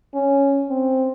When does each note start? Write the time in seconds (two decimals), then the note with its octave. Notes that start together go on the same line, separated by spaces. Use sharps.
0.14 C#4
0.70 C4